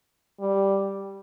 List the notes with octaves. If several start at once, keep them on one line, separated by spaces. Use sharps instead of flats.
G3